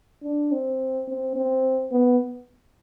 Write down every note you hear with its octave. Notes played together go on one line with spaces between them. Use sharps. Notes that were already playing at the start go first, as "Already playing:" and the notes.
D4
C4
C4
C4
B3